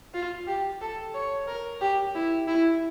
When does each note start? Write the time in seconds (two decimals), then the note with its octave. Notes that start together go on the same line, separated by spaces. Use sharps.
0.14 F4
0.47 G4
0.81 A4
1.14 C#5
1.47 A#4
1.81 G4
2.15 E4
2.48 E4